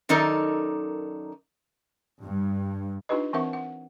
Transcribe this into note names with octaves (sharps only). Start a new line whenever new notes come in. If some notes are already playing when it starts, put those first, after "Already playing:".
F#2 D#3 D#4 A4 A#4 D5
G2
D4 D#4 F4 G4 B4 D#5
E3 C4 A#4 E5 F#5 C#6
F#5